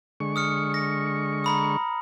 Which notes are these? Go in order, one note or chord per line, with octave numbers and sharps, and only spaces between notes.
D3 G#3 C#6
D#6 F6 C#7
A#6
A#5 B5 D#6